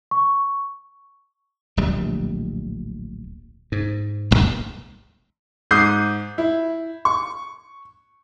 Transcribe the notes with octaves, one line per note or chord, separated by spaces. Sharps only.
C#6
D1 A#1 G3
G#2
D1 G#1
G#2 D6 D#6 G6 C7
E4
C#6